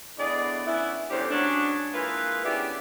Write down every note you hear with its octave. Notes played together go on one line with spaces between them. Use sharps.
A2 B3 D4 G#4 D5 D#5
B3 C#4 D4 E4
E2 A3 C#4 D4 G4 C5
F#3 G#3 C#4 D4
E3 G#3 A#3 F4 B4
B3 C#4 D4 E4 G4 G#4